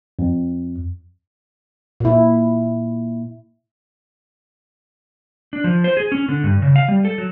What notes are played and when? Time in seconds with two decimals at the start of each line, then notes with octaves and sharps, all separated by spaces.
0.19 F2
2.00 A#2 E4
5.53 D4
5.64 F3
5.84 C5
5.97 G#4
6.12 C#4
6.28 D3
6.43 G2
6.62 C#3
6.76 F5
6.88 G3
7.05 A4
7.18 F#3